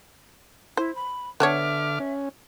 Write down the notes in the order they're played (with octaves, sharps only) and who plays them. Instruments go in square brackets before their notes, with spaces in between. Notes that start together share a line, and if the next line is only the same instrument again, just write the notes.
[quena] E4 [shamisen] C5
[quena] B5
[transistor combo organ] D3 D6 F6 [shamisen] B3 D4 C#5 [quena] E5
[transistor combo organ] C#4